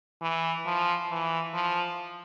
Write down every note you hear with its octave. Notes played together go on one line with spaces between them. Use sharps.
E3
F3
E3
F3